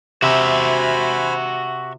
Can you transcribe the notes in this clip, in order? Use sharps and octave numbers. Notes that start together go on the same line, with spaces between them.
C3 F#4 C5 E5 G#5 B5